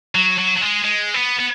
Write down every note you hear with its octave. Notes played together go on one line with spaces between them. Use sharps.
F#3
F#3
F#3
G#3
G#3
B3
B3